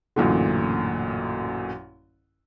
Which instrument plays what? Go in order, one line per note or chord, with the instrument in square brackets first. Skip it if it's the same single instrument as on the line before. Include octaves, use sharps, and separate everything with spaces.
[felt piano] A1 F#2 A#2 D3